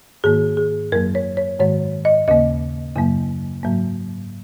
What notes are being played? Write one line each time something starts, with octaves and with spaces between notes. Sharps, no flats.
G#2 D#3 A#3 G#4
G#4
F#2 F#3 A#3 A#4
C#5
C#5
G#2 D#3 G#3 C#5
D#5
D#2 C#3 A#3 D#5
F#2 C#3 F#3 A#3
G#2 F#3 A#3